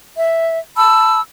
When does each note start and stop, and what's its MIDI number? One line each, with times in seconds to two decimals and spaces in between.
0.17 0.60 76
0.76 1.20 81
0.76 1.20 83
0.76 1.20 88